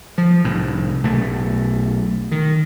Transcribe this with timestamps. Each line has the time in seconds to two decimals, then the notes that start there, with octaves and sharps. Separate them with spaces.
0.18 F3
0.45 C2 A2
1.04 B1 A3
2.32 D#3